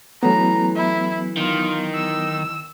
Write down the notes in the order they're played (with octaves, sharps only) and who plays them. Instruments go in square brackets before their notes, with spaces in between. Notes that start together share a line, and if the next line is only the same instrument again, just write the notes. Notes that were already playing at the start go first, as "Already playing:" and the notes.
[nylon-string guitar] E3 A3 C#4 [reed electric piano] F#3 B3 [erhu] A#5
[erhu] E4
[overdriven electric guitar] D#3 [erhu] F4
[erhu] E6